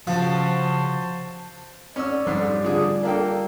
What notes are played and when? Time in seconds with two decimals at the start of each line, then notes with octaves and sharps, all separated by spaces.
0.07 C#3 F3 F#4 C5 A5
1.96 C#4 D5 E6
2.27 F2 G#2 G3
2.64 D3 F4 G#4
3.03 A#3 D4 A4 G5